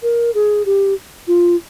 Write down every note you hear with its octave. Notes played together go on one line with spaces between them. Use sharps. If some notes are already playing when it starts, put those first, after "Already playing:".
A#4
G#4
G4
F4